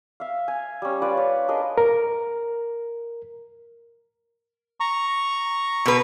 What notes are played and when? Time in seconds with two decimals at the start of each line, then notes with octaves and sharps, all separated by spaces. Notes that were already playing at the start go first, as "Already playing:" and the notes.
0.20 E5 F5
0.48 G#5
0.82 G3 C#4
1.02 F4 B4 D5
1.17 C#5
1.48 D4 G#4 A#4 D#5
1.78 A#4
4.80 A#5 C#6
5.86 B2 B4